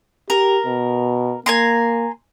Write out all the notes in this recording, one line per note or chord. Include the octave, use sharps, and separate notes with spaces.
G4 A#4
B2
A#3 G#5 A#5 C6